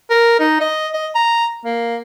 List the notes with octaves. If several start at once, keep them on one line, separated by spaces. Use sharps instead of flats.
A#4
D#4
D#5
D#5
A#5
A#3